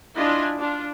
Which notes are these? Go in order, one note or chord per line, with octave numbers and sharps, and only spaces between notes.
D4 E4 F4 D#5 G#5
D4 F4